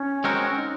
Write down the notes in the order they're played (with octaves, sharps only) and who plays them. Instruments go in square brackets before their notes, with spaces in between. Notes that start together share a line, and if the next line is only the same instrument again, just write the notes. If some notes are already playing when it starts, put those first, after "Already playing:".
Already playing: [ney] C#4
[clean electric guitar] G#3 C4 F#4 A#4
[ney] D#4